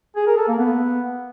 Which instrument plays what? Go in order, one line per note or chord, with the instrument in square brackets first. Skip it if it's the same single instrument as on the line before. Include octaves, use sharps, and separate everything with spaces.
[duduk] G#4
A#4
A4
A#3
B3